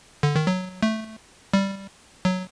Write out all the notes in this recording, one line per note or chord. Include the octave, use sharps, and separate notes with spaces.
D3
D#3
F#3
A3
G3
F#3